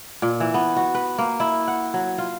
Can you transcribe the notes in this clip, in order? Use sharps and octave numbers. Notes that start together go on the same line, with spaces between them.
A#2
E3
B3
F#4
B4
A#3
E4
F#5
F#3
F4